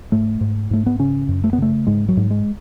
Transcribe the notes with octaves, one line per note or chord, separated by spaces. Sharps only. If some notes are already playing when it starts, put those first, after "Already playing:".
G#2 A3
G#2
G#2 A3
B3
C#3 C#4
F#2
A3
B3
C#3 A3
G#2 G#3
F#3
G#2
G#3